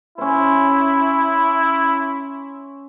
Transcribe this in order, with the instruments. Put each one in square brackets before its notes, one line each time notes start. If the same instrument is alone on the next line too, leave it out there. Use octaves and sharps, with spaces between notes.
[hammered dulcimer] C#4 C5 [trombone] E4